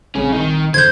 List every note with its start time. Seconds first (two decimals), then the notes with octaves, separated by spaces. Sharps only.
0.15 A#1 G3 C4 C#4 G#4
0.32 D#3 D#4
0.74 F2 D3 C5 G6 G#6